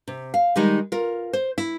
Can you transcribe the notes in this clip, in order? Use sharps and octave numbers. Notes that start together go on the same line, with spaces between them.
C3
F5
D#3 G3 G#3 D#4
F4 A#4
C5
E4